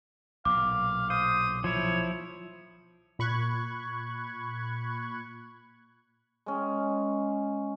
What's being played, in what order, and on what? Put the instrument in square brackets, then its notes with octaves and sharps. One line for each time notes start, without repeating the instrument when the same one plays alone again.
[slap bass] B1 A#2 [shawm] F5 [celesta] D6
[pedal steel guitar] C5 [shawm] D#6
[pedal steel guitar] F3 E4 [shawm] C#5
[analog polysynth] A#2 B5 C#6 F#6 G#6
[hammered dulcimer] G#3 C#4